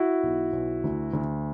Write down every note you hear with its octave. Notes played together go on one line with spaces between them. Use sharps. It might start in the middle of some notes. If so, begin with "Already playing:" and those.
Already playing: E4 F#4
B1
B1
D2
D2